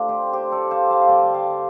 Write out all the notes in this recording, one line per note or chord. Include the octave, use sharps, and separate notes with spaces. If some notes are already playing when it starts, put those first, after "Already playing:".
Already playing: C3 A3 C4 D4 F4
G4 C5
G4 C5
A4 D5
C5 F5
F5 A5
F5
D3 G3 C4 D5 G5
F5 A5